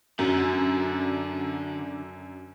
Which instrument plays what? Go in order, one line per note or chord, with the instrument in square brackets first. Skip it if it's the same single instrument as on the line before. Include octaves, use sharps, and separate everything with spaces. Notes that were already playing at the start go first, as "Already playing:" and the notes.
[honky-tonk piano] F#2 [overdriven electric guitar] D3